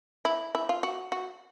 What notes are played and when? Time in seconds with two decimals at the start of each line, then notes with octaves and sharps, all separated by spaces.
0.25 E4
0.55 E4
0.69 F4
0.83 F#4
1.12 F#4